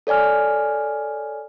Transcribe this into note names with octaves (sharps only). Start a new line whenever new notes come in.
A4 C#5 D5 G#5 F6